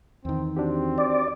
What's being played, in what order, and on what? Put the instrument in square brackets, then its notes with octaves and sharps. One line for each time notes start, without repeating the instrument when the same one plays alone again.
[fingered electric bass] E2 D#3 [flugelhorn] C4
[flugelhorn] C4 [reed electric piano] D4 F#4 G4
[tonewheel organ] D5